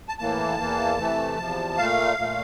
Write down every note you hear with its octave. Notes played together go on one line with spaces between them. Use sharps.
A5
A2 E3 A#3 A5
E2 E3 A#3
C3 E3 A3
E2 C3 F3
A#2 A3 F5
A#2 A3